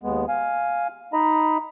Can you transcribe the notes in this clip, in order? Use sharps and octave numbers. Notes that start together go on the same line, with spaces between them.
D#2 G#3 B3
F5 G#5
D#4 D#5 A#5 B5